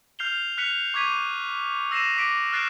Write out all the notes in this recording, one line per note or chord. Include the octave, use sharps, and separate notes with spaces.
F6 G6 C7 F7 G7
F6 F#6 B6 C#7 F7
C#6 D6 G#6 B6 D#7
E6 A#6 C7 D#7 E7
D6 B6 D7
F6 F#6 A6 C7 D7 E7